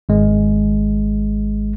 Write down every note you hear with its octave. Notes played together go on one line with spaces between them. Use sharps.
G#1 G#3